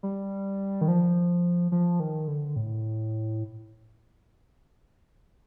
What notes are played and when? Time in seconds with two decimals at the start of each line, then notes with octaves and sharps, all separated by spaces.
0.03 G3
0.81 D#3
0.88 F3
1.72 F3
2.00 D#3
2.28 D3
2.56 A2